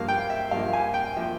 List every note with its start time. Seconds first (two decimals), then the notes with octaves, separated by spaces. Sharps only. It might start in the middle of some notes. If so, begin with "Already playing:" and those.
Already playing: G2 F3 A#3 F5
0.08 G5
0.30 E5
0.51 G2 F3 A#3 F5
0.73 G#5
0.94 G5
1.16 F3 A#3 E5